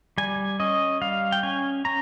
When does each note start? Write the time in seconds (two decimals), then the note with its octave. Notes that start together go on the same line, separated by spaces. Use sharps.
0.18 G3 G#5
0.60 C#4 D#5
1.01 G3 F5
1.32 G5
1.43 C#4 G#5
1.85 C#4 A#5